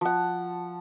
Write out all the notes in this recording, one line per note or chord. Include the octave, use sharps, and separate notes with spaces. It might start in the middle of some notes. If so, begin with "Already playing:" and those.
F3 F#5